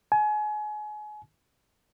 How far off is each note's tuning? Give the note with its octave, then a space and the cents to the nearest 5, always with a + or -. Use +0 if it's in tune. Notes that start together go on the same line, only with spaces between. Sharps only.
G#5 +30